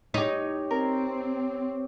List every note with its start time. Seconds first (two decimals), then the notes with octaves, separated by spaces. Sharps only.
0.14 D#4 G4 C#5
0.71 C4 A#4